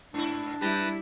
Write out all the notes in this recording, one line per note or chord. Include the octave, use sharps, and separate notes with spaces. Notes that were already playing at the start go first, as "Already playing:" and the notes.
G#2 D4 E4
G3 E4 G4 B4 A5 A#6